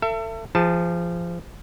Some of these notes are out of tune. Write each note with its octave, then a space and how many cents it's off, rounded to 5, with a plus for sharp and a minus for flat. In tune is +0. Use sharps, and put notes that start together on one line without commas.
A4 +35 E5 +30
F3 -25 G#4 -25 A5 +5